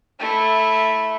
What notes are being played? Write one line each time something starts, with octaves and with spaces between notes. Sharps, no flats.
A3 E4